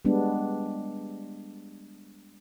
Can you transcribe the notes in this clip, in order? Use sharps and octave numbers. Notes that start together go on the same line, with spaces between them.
G3 G#3 B3 D4